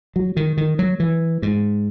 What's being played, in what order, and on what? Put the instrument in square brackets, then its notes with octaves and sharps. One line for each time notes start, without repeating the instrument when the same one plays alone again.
[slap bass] F#3
D#3
D#3
F#3
E3
G#2